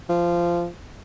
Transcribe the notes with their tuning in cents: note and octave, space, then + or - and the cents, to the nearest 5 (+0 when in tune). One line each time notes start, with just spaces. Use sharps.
F3 -15